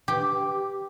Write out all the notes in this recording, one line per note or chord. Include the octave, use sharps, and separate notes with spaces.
G4